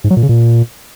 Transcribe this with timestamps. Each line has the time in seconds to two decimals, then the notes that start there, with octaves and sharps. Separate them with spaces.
0.04 G#2
0.10 F#3
0.17 A#2
0.23 C#3
0.29 A#2